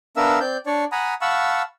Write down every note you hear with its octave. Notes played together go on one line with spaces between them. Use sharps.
B3 D4 A#4 E5 F5 E6
C4 D5 G6
D4 C#5 D5
F#5 G#5 A#5 B5 D#6
F5 F#5 A5 B5 C#6 E6